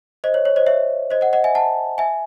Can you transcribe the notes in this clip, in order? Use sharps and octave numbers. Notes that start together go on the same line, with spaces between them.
C5 D#5
C#5
C#5
C5 D#5
C#5 E5
C5 D#5
D#5 F#5
D#5 F#5
E5 G#5
F#5 A5
E5 G#5